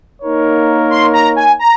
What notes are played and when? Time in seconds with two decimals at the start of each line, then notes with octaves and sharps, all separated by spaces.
0.22 A#3 D#4 A#4 C#5
0.90 C6
1.13 A#5
1.36 G#5
1.59 A#5